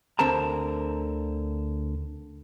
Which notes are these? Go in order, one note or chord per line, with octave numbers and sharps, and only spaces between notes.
D2 D3 C4 A#4 A5 A#5